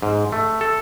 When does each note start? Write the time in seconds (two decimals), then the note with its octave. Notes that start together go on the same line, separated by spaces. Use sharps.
0.02 G#2
0.32 A3
0.61 A4